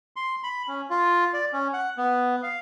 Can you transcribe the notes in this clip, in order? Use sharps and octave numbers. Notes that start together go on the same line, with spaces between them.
C6
B5
C#4
F4
D5
C#4
F#5
B3
F5